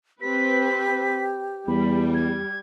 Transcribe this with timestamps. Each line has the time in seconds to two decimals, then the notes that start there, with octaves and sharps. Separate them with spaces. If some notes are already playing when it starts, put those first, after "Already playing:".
0.21 C4 G4 B4 B6
1.68 E2 G3 B5
2.14 G#6